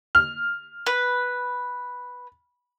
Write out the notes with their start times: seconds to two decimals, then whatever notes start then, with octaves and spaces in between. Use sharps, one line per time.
0.15 F6
0.86 B4